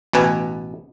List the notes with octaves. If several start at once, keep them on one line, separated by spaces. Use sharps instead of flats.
A1 B2 B4 G#5